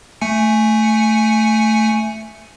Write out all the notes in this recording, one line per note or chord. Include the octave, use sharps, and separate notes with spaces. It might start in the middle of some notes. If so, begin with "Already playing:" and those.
A3 G#5 C#7